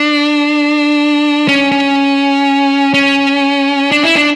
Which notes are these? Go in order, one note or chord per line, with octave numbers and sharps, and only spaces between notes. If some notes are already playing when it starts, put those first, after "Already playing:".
Already playing: D4
C#4
C#4
C#4
D4
E4
D4